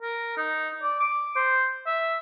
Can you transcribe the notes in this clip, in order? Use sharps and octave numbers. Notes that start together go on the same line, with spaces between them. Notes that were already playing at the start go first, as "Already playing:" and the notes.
A#4
D#4
D5
D6
C5
E5